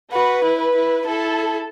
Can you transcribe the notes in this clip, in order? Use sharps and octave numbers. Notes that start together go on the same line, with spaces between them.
F#4 B4
E4
B4
E4
E4 A4